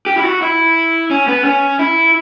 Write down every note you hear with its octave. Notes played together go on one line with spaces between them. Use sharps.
G4
E4
F#4
E4
C#4
B3
C#4
E4